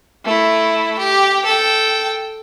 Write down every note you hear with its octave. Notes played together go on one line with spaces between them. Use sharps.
A3 E4
G4
A4 G5